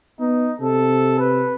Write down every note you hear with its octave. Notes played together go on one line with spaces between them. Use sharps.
B3 D#4
C3 A4
B4